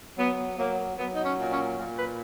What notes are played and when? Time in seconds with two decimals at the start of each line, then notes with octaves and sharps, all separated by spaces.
0.18 F#3 B3
0.58 F#3 A#3
0.98 F#3 B3
1.13 D#4
1.24 C#4
1.38 A#2
1.51 C#4
1.77 A#2
1.97 B4